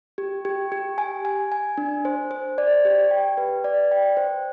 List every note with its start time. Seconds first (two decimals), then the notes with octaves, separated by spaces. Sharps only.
0.18 G4
0.45 G4
0.72 G4
0.98 G#5
1.25 G#5
1.52 G#5
1.78 D4
2.05 C5
2.31 C5
2.58 D5
2.85 G4
3.11 G5
3.37 B4
3.64 D5
3.91 G5
4.17 C5